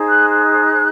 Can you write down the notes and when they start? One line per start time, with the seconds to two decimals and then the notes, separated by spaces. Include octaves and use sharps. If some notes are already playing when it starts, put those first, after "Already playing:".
Already playing: D#4 G#4 C5
0.09 F#6
0.29 F#6